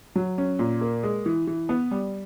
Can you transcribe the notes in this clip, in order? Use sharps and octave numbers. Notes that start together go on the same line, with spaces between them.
F#3
C#4
A#2
A#3
G#3
E3
E3
B3
G3